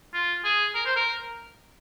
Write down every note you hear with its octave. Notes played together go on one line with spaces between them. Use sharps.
F4
G#4
A#4
C5
A#4